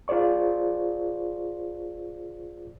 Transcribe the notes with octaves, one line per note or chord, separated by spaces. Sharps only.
F4 G#4 C5 D5 C#6